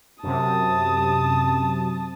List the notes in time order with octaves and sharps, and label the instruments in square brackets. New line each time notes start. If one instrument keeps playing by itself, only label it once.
[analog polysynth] F#2 C3 [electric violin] A5 D#6